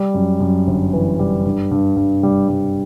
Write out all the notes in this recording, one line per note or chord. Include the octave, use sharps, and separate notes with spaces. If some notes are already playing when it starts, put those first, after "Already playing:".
Already playing: G3
F#2
F#2
G1
E3
G3
G2
G2
G2
G3
G3